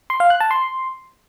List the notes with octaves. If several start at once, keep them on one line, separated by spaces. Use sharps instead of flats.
C6
F5
F#6
A5
C6